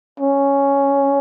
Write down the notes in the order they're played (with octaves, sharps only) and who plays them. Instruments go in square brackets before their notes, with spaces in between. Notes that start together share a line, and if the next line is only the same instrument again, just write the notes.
[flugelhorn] C#4